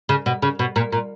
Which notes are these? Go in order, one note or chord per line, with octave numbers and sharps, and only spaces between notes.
C#3
B2
C#3
B2
A#2
A#2